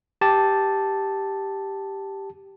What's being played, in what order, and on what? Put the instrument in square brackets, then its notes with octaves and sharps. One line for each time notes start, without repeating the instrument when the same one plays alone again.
[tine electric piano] G4 A5